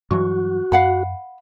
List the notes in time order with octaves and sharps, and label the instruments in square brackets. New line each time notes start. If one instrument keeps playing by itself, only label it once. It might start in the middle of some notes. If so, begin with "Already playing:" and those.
[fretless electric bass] G2 E3 F#3 [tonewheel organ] F#4
[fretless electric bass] F#2 [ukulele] F5 F#5 B5